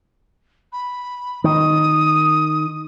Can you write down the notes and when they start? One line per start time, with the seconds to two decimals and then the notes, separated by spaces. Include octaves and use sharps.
0.73 B5
1.44 D#3 D#6